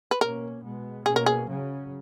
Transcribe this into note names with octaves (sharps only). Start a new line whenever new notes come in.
B4
B2 A#3 C#4 A#4
B2 G#3 B3
B2 A#3 C#4 G#4
A#4
G#4
C#3 F#3 C#4